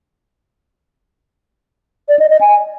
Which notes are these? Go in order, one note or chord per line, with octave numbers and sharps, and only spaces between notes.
D5
D#5
D#5
G#5